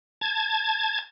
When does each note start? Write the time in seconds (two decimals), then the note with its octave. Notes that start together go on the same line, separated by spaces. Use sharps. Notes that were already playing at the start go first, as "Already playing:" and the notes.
0.21 A5 G#6